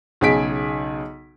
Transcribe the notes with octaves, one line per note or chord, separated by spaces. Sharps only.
B1 C#3 G#4 G#5 B6 D7